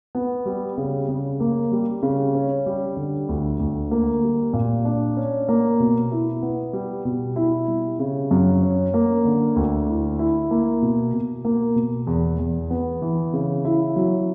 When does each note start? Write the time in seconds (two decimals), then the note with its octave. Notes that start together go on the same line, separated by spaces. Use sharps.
0.15 B3
0.46 G3
0.78 C#3
1.09 C#3
1.40 A#3
1.72 G3
2.03 C#3
2.35 C#4
2.66 G3
2.97 D3
3.29 D2
3.59 D2
3.91 A#3
4.23 G3
4.53 A#2
4.85 D4
5.17 C#4
5.48 A#3
5.80 B2
6.11 E4
6.42 B3
6.73 G3
7.05 B2
7.36 E4
7.68 G3
7.99 C#3
8.31 F#2
8.62 C#4
8.94 A#3
9.25 D3
9.56 D2
9.88 E4
10.19 E4
10.51 A#3
10.82 B2
11.14 B2
11.45 A#3
11.76 B2
12.07 E2
12.39 E2
12.70 B3
13.02 E3
13.33 C#3
13.65 E4
13.96 F#3